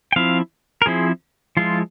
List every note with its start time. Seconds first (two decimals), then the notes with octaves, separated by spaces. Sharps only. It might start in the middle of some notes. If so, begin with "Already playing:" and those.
0.12 G5
0.16 F3 C4 E4 F5
0.82 A#4
0.86 F3 C4 E4 G#4
1.57 F3 G#3 E4 F4